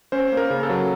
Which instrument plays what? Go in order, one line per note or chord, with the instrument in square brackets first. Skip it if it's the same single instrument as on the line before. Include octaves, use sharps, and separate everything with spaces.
[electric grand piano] C#4 C5
A#3
A#4
C#3
A4
F#3